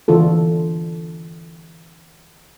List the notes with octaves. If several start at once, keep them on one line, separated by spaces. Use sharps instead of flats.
D3 E3 D4 F4 A4